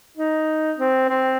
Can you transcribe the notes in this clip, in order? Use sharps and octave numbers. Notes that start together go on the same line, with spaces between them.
D#4
C4
C4